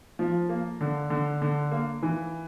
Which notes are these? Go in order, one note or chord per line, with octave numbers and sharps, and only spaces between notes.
F3
A#3
D3
D3
D3
A#3
E3